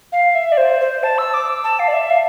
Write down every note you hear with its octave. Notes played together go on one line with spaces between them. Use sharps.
F5
E5
D5
C5
C5
A5
E6
D6
A5
F5
D5
E5
F5